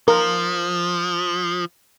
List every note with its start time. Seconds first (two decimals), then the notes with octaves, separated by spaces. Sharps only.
0.08 F3 A#4